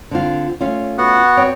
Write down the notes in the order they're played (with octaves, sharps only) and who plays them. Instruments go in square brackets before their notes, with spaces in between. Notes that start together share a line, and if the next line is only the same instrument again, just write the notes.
[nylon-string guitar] D3 C4 F4
A3 C#4 F4
[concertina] B3 F#4 F#5
[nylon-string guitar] C4 C#5 G5